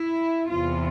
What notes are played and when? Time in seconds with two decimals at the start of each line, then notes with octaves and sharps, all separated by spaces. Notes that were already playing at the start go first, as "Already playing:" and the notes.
Already playing: E4
0.49 E2 C3 E3 F4